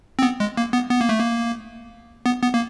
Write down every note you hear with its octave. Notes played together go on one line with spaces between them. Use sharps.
C4
B3
G#3
A#3
B3
B3
A#3
A3
A#3
B3
B3
A#3